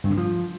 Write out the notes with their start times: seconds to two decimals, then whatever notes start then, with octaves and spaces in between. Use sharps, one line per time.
0.04 G2
0.11 D3
0.17 F3